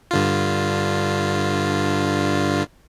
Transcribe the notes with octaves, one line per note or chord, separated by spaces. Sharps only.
G2 D3 F4